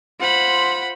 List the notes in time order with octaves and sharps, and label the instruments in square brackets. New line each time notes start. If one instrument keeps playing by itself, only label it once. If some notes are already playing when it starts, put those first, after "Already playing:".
[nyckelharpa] F4 C5 [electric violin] F#5 B5